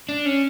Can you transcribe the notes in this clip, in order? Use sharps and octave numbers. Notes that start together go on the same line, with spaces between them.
D4
C#4